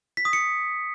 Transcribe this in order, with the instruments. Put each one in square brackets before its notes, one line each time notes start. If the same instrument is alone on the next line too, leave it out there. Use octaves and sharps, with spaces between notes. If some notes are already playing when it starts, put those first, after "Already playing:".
[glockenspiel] B6
D#6
C#7